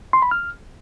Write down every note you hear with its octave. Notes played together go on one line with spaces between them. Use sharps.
C6
B5
F6